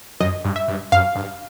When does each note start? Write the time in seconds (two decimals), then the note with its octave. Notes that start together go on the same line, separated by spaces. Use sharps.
0.20 F#2 D#5
0.44 G2
0.56 E5
0.68 G2
0.92 F#2 F5
1.15 G2